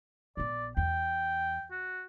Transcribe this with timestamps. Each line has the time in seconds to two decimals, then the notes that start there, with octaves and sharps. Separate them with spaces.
0.37 A#1 B3 D5
0.77 E2 G5
1.71 F#4